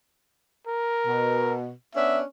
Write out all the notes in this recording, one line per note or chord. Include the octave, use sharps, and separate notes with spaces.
A#4
B2
B3 C#4 D4 E5